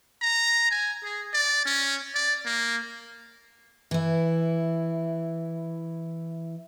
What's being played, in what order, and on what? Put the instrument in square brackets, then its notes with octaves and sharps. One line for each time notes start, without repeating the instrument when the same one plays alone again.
[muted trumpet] A#5
G#5
G#4
D5
C#4
D5
A#3
[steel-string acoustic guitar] E3 E4